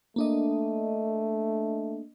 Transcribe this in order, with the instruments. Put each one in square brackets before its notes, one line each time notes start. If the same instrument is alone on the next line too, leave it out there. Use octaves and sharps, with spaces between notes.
[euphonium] A3 [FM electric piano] A#3 D4 D#5